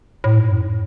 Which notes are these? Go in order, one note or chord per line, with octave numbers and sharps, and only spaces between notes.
A2
G#2
F#2